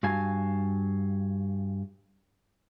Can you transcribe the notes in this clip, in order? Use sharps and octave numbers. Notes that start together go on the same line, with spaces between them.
G2 F#4 F5 G#5 A5